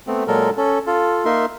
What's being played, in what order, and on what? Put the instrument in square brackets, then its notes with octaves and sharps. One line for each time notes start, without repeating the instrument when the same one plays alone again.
[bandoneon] A3 B3 C4
A#2 F#3 G#3 A4 A#4
C#4 A4
F4 A4
A#3 D#4 A#4 E5 C6